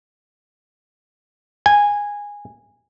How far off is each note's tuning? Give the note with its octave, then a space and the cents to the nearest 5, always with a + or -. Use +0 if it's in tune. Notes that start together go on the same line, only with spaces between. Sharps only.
G#5 -15